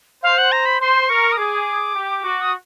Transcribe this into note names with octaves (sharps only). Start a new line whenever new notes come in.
C5 F5
F#5
A#5
B5
C5 C6
A#4 C#6
D#6
G#4 D6
G4
F#4
D#6